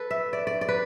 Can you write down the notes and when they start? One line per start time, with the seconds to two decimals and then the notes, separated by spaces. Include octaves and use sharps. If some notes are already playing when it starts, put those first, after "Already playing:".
Already playing: A4 B4
0.11 E5
0.33 D5
0.47 D5
0.61 D5
0.69 B4